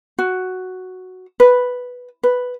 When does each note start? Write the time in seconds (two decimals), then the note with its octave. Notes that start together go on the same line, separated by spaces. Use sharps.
0.19 F#4
1.40 B4
2.23 B4